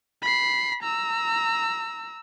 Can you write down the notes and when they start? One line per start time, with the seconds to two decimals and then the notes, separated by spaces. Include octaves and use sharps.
0.22 B5 C7
0.83 A#5 E6